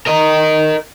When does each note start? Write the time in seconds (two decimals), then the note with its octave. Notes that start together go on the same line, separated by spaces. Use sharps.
0.06 A#4 D#5